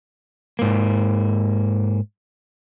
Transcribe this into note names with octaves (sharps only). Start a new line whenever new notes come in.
G#2 A#3